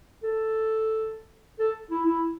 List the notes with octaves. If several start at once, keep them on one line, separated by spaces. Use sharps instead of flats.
A4
A4
E4
E4